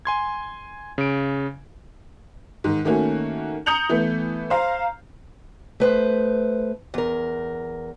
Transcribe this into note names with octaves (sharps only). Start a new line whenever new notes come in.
G#5 C6 G#6
C#3 D7
G#2 D#3
D#3 A3 A#3 C#4 F#4
A#5 D#6 G6 C#7 F7 F#7
E3 A3 B3
C5 F5 A#5
A3 B4 C5
E2 A#4